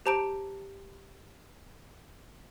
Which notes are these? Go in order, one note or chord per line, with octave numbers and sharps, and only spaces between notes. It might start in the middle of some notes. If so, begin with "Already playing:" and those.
G4 C5 A5 A#5 G6 D7